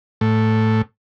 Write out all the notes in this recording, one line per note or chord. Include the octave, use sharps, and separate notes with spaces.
A2